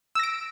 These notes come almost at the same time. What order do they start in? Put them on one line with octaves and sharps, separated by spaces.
E6 A#6 D7